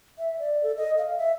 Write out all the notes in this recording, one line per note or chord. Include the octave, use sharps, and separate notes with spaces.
E5
D5
A4
D#5
F5
E5